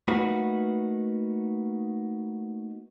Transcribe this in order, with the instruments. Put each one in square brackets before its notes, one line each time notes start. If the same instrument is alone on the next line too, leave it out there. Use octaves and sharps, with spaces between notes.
[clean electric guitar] A3 A#3 D#4 F#4 B4